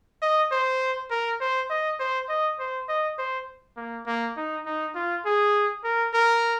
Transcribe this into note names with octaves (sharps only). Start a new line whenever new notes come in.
D#5
C5
A#4
C5
D#5
C5
D#5
C5
D#5
C5
A#3
A#3
D#4
D#4
F4
G#4
A#4
A#4